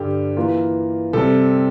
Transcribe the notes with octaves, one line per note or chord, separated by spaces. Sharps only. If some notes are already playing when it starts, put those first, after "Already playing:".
Already playing: G2 D3 G3 G4
E3 A#3 F4
C3 G3 C4 A4